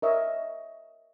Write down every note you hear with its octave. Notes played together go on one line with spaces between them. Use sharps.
A#4 C#5 D#5 E5